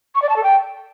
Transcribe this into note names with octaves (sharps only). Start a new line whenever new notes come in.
C#6
D5
A5
A4
G5